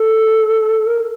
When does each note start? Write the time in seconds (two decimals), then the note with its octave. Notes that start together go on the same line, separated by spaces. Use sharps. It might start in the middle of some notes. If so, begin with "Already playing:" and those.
Already playing: A4
0.86 A#4